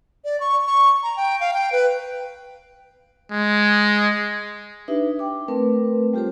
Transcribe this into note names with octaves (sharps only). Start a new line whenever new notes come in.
D5
C#6
C#6
A#5
G5
F5
G5
B4
G#3
D4 D#4 G4 B4 E5
G5 D6
A3 C4 A#4 B4
G3 F4 G4 A4 C5